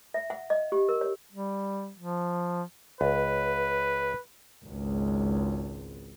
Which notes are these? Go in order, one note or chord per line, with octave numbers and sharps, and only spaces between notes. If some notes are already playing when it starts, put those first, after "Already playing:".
E5
F#5
D#5
G4
A#4
C#5
G3
F3
C#2 B4
G#1 C#2